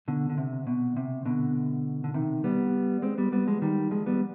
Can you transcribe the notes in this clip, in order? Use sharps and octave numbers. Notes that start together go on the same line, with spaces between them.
B2 D3
D3
C3
B2
C3
B2 D3
D3
C3 D#3
G3 B3
G#3 C4
G3 B3
G3 B3
F3 G#3
D#3 G3
F3 G#3
G3 B3